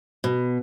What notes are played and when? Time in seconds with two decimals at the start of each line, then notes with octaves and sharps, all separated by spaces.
0.24 B2